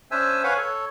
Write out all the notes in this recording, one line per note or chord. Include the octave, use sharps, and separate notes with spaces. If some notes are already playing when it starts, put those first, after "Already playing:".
C#4 D4 C5 E5 G#5 E6
B4 C#5 F5 F#5 G#5
A4 C#5